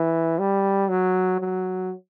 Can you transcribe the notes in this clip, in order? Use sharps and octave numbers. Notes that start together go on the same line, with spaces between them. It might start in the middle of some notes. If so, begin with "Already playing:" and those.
Already playing: E3
G3
F#3
F#3